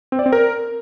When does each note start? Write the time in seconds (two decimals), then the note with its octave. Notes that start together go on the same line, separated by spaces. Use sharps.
0.12 C4
0.19 D5
0.26 C4
0.33 A#4